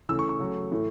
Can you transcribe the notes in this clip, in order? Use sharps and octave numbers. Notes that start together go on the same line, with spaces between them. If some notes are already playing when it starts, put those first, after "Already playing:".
C#3 E3 A3 E6
C#6
C#6
C#3 F#3 A3
A2 E3 A3